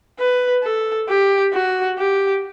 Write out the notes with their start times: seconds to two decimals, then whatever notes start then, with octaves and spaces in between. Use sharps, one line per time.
0.19 B4
0.63 A4
1.09 G4
1.53 F#4
1.98 G4